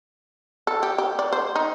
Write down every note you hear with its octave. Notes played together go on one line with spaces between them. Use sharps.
A4
G4
G4
D5
C5
D#4